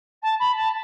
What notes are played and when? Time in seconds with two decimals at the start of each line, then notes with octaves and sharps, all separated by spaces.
0.22 A5
0.39 B5
0.56 A5